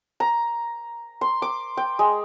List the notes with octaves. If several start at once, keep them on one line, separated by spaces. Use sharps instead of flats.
A#5
C6
D6
G5
G#3